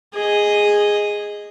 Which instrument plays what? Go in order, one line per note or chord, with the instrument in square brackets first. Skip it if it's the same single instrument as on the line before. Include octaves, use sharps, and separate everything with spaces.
[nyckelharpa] G#4 D#5